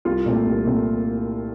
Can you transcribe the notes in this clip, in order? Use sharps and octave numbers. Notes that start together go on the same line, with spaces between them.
C2 F4
A#2 A3 C4
C2
A#2 A3 C4